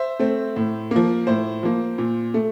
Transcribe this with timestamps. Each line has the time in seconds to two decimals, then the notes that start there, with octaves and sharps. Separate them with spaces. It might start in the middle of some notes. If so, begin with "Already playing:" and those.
Already playing: C5 E5
0.19 A3 C4
0.56 A2
0.91 F3 A#3
1.27 A2 C5
1.63 F3 A#3
1.98 A#2
2.34 A3